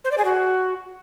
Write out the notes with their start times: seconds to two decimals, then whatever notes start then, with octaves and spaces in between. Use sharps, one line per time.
0.04 C5
0.11 D5
0.18 G#4
0.25 F#4